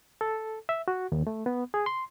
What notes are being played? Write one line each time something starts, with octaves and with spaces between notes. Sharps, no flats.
A4
E5
F#4
D#2
A3
B3
G#4
C6